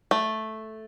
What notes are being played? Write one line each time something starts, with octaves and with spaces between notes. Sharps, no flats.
A3